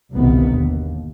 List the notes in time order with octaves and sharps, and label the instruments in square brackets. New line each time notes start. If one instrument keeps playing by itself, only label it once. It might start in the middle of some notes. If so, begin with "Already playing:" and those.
[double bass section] G1 C2 G2 B2 D#3 B3
D#2